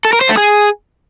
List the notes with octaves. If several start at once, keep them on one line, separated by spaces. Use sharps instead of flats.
A4
A#4
C5
A3
G#4